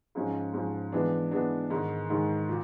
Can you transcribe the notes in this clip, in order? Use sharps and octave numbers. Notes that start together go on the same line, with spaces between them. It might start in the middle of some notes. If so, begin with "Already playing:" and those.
G#2 F3 G#3 C#4
G#2 F3 G#3 C#4
E3 G#3 B3 D4
E3 G#3 B3 D4
G#2 D#3 G#3
G#2 D#3 G#3
A#2